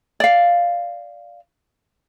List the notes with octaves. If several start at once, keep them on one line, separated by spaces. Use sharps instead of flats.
D5 F5